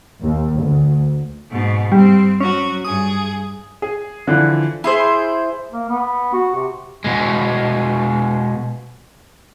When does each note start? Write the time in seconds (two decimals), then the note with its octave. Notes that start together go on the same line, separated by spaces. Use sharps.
0.21 D#2
0.59 D2
1.50 G#2 B2
1.92 G2 G3 C4
2.41 F#3 C#4 F#4
2.85 G2 G#4 D#6
3.82 G#4
4.27 D3 E3 F3
4.84 E4 G#4 C5
5.71 A#3
5.89 B3
6.33 F#4
6.55 C3
7.04 B2 G#3